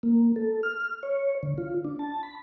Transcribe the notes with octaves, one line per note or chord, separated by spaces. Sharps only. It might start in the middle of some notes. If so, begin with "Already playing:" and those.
A#3
A4
F6
C#5
D3
F4
D4
A5
B5